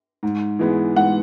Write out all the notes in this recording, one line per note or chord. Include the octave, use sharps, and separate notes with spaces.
G#2
E3 G#3 B3
G#2 F#5